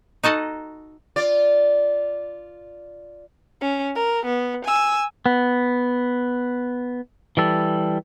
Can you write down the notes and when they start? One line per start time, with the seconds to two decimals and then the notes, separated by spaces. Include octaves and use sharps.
0.23 D#4 F#4 A4 D#5
1.16 F4 D5
3.61 C#4
3.95 A#4
4.26 B3
4.65 G#5 E6
5.26 B3
7.37 E3 G3 A4